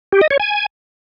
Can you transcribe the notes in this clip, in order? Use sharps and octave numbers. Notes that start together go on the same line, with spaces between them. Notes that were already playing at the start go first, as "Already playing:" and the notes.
G4
D#5
C#5
G#5